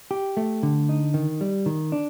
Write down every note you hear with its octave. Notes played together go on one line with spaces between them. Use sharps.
G4
A3
D3
D#4
D#3
G3
D#3
D4